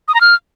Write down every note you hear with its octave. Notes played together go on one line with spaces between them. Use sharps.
D#6
A#5
F6